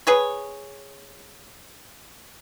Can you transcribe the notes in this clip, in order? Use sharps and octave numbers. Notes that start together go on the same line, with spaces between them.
G#4 B4 C#5